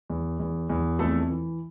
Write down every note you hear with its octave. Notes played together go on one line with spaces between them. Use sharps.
E2
E2
E2
F2 A3 A4
E3